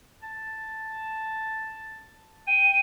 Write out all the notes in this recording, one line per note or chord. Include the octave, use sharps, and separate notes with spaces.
A5
G5 D#7